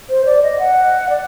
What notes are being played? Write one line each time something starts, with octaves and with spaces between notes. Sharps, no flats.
C5
D5
D#5
F#5
D5